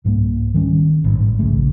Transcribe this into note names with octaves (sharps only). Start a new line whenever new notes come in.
C2 G#2 G3 A#3
D#3 G3 C#4
A1 G#2
D1 A#1 C#3 A3